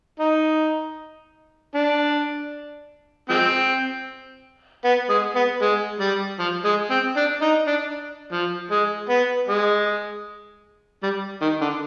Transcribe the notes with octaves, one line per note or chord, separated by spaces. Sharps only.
D#4
D4
F3 G#3 C4
B3
G#3
B3
G#3
G3
F3
G#3
C4
D4
D#4
D4
F3
G#3
B3
G#3
G3
D#3
D3